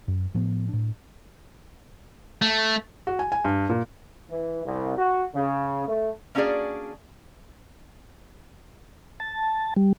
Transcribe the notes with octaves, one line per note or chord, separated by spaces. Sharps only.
F#2
A2 F3 B3
A2 D4
A3
F#4
G#5
G#5
G2
A#2
E3
C2
F#4
C#3
A3
A#3 C#4 D4 F#4 G#4 D5
A5
G3